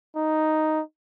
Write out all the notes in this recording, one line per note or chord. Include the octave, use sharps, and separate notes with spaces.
D#4